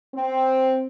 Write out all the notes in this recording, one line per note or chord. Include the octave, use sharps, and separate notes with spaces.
C4